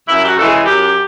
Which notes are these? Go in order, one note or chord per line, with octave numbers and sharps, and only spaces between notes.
F#2 E4
G4
F#4
C#3 E3 G#3 A4
G#4
F#2 G4